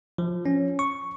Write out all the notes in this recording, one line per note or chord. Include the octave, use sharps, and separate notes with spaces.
F3
C#4
C#6